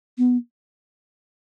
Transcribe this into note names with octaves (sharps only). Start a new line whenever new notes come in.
B3